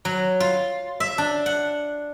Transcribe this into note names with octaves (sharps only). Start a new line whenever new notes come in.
F#3
F4
E5
D4
F#5